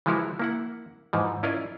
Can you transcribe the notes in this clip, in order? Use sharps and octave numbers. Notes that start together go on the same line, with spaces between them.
E3 F3 G#3 E4 F#4 A#4
A#3 E4 F#5
G#2 E3 F3
C#4 E4 F4 A#4 D5 D#5